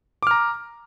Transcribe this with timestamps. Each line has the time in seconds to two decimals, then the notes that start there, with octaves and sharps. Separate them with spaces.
0.23 D6
0.27 F6
0.31 A#5